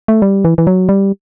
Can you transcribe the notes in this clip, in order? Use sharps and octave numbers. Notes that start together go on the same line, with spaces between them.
A3
G3
E3
E3
F#3
G3